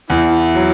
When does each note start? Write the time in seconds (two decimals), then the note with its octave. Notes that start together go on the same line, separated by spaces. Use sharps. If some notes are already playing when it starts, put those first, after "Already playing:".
0.10 E2 E4
0.55 F#3